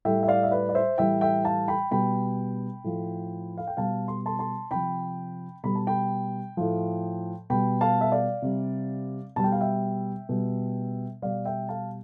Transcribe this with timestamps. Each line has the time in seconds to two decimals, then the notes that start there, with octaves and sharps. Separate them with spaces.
0.05 A2 G3 E5 G5
0.23 E5
0.28 D5 F5
0.43 E5
0.51 B4 D5
0.69 D5
0.75 C5 E5
0.98 A2 E3 G3 E5 G5
1.21 E5 G5
1.44 F5 A5
1.68 G5 B5
1.91 B2 G3 G5 B5
2.84 A2 F3
3.58 F5
3.67 G5
3.77 B2 G3 F5 A5
4.08 C6
4.26 A5 C6
4.39 A5 C6
4.71 C3 F3 G5 B5
5.63 B2 G3 B5
5.75 A5
5.87 G5 B5
6.57 A2 F3
7.50 B2 G3 G5 B5
7.81 F5 A5
8.01 E5
8.12 D5 F5
8.42 C3 G3
9.36 B2 G3 A5
9.44 G5
9.52 F5
9.61 E5 G5
10.29 B2 G3
11.22 B2 G3 D5 F5
11.45 E5 G5
11.69 F5 A5